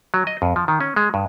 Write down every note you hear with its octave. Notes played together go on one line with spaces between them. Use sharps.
F#3
D#5
F2
F3
D#3
C#4
G#3
G2